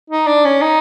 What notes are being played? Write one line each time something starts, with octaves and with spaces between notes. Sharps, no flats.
D#4
D4
C#4
D#4